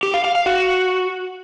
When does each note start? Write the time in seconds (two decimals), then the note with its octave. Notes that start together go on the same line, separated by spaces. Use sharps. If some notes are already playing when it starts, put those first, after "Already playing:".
0.03 G4
0.14 F5
0.24 F5
0.35 F5
0.46 F#4